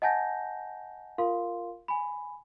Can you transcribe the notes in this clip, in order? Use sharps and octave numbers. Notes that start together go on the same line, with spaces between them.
D#5 F#5 G#5 A5 G6 A#6
F4 A#4 F5 C6
G#5 B5